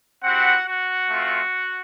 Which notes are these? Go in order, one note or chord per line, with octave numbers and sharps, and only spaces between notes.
C4 E4 F#4 G4 F#5
F#4 F#5
A3 C4 F4